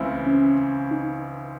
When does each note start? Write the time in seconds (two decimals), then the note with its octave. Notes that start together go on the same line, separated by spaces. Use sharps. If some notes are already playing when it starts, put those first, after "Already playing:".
Already playing: C#2 C#3 E3 A3 C4 E4
0.26 C#4
0.91 D#4